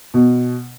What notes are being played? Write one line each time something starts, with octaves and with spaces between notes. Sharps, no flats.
B2